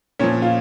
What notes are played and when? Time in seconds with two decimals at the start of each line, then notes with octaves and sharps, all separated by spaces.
0.19 A#2 F3 C#4
0.42 F4